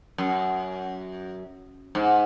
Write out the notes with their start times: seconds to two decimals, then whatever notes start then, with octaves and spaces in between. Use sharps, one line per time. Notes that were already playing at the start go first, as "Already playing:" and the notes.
0.18 F#2
1.95 G#2